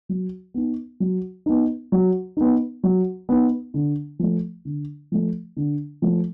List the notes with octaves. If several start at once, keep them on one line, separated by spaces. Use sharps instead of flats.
F#3
B3 D#4
F#3
B3 D#4
F#3
B3 D#4
F#3
B3 D#4
D3
F3 A3
D3
F3 A3
D3
F3 A3